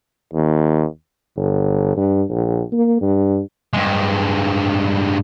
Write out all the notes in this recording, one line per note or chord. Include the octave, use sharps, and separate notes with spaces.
D#2
G1
G2
A#1
A#3
G2
G2 G#3